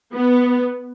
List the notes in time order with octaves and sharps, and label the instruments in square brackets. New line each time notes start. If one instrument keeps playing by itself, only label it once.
[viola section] B3